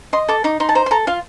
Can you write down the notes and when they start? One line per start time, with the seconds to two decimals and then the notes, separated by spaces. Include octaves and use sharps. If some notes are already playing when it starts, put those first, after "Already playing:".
0.13 D#5 C6
0.28 A4 D6
0.44 D#4 D6
0.60 D#4 C6
0.69 A5
0.75 C5 A#5
0.86 C6
0.91 A4 A#5
1.07 F4 F5